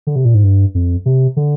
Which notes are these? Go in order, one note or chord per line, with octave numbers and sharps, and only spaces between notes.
D3
C3
A#2
G#2
G2
F2
C3
D3